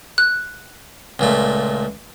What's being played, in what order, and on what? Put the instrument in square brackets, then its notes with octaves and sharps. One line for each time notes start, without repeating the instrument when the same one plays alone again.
[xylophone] F#6
[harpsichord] C#2 A#2 A3